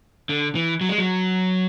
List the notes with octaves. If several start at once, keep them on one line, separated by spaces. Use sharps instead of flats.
D3
E3
F#3
G#3
F#3